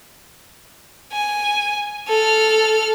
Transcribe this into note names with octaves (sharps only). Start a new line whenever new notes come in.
G#5
A4 F6